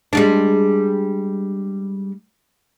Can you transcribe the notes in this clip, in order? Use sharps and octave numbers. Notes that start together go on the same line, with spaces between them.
G3 G#3 D4